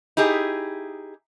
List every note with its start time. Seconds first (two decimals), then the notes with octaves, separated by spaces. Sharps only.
0.17 D#4 E4 G4 G#4